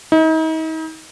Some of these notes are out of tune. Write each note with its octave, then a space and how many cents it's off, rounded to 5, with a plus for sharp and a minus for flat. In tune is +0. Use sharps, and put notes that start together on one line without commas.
D#4 +40